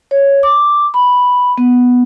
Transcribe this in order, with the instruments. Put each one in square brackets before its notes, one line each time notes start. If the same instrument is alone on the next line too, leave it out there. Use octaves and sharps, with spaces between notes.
[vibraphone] C#5
D6
B5
B3